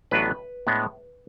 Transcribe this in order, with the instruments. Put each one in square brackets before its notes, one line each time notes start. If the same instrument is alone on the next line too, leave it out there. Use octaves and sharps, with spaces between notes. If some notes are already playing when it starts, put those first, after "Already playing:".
[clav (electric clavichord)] A1 A2 F#3 B3 D4 B4
A2 G#3 B3 D4